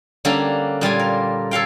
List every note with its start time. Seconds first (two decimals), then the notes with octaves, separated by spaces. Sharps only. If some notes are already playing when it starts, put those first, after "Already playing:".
0.25 D3 G3 A#3 C#4 D4
0.81 A#2 G3 F4 G#5
0.99 A#4
1.51 A4 C#5 F5 G5